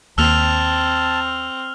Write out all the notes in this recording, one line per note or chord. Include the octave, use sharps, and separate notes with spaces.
D#2 A#3 C4 A5 E6 F6 F7